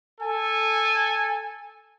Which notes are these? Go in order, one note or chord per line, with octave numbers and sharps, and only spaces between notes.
A4 G#5